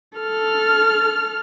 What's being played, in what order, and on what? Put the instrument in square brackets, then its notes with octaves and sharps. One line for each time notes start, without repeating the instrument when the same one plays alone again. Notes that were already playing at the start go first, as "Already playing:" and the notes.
[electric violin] A4 F6